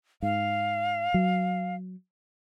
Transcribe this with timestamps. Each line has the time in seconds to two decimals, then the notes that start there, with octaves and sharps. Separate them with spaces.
0.22 G#2 F5
1.14 F#3